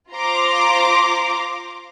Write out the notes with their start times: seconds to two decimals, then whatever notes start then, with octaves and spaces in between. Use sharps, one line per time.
0.13 F4 C5 A#5 C6 D6